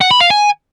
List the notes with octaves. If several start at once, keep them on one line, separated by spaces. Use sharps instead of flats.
F#5
B5
F5
G#5